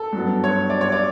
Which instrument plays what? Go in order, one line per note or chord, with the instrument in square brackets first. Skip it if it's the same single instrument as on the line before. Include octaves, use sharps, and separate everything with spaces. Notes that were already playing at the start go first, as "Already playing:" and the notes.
Already playing: [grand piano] A4
G2 F#3 B3
C#5
D5
C#5
D5